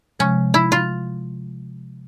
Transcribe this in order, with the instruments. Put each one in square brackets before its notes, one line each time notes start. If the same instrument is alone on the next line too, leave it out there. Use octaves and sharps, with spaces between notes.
[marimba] C3 F3 G#3 [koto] C#4
[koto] E4
F4